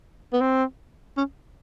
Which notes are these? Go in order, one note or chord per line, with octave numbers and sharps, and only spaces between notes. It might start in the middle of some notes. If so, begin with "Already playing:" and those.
B3
C4
C#4